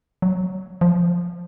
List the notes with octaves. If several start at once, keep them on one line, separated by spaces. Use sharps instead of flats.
F#3
F3